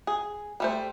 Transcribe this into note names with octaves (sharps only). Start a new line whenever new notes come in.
G#4
G3 A3 C5